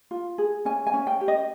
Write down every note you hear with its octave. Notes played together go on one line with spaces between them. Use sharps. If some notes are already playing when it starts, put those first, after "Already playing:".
F4
G#4
C#4 G#5
G#5
C#4
G5
G4
D#5